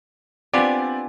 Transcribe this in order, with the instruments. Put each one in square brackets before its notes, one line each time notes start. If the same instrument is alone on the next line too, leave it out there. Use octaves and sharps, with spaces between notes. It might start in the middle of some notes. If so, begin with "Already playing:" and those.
[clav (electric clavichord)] B3 F4 G4 [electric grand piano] C4 D5 [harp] D4 G#5